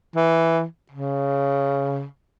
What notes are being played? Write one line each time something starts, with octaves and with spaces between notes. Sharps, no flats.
E3
C#3